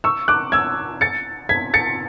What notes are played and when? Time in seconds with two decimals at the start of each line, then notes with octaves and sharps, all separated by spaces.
0.04 C#6 E6
0.28 D6 F#6
0.52 E6 G#6
1.01 A6 C#7
1.49 G#6 B6
1.74 A6 C#7